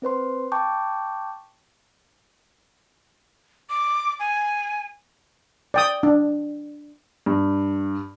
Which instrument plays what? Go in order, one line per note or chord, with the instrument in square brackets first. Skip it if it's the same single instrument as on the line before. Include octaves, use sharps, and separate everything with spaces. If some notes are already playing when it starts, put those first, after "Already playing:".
[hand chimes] C4 B4 C5 C6
G5 A5 C#6 D6 G6
[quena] D6
G#5
[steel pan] D5 G5 D#6
D4
[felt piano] G2